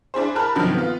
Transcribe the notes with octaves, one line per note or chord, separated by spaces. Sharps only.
D4 E4 G#4 C5
A#4 A5 B5 F6 F#6
G2 C3 D#3 F3 F#3
B3 F4